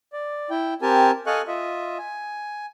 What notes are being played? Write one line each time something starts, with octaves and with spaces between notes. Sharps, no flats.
D5
E4 G5
C4 G4 A#4 G#5 A5
A4 D#5 F5 G#5 C#6 F#6
F4 D#5 E5
G#5